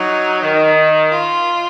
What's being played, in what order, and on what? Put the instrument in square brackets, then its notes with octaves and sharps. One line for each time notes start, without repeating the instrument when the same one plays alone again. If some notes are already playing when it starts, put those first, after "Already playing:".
Already playing: [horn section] F#3 [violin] D#4
[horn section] D#3
[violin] F4